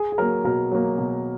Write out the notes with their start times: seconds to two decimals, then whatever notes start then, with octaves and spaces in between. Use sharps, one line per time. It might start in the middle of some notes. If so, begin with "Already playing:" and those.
Already playing: G#4
0.12 G#4
0.18 F#3 A#3 A#4
0.44 B2 A#4
0.71 F#3 A#3
0.98 B2